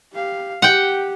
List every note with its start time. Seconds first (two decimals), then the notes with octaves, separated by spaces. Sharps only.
0.12 G4 F5
0.62 G4 F#5 G5